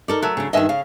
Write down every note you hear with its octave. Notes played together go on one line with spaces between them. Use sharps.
D#4 A4 A#4 D5
F#3 A3 A#4
C#3 D4
G2 D#3 D#5 E5 G#5
C#3 F5